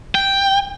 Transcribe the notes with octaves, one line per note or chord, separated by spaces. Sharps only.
G5